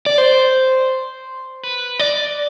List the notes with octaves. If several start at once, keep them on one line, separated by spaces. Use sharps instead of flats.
D5
C5
B4
D5